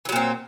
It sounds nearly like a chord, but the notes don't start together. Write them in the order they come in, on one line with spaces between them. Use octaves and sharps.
E3 F#3 A#2 C4